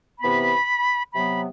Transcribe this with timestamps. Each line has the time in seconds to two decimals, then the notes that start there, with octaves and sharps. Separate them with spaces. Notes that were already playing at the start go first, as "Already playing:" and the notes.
0.20 C3 E3 B3 B5
1.13 C3 F#3 B3 B5